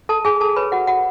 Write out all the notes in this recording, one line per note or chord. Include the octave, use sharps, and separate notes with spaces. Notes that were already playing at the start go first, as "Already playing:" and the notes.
A4 A5
G#4 G#5
A4 A5
F#4 B4 C#5 B5
F#4 F#5
F#4 F#5